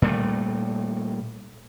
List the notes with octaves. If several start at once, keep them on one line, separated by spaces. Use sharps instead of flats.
A#2 G3 A3